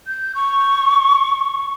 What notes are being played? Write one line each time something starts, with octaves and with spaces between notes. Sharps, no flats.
G6
C#6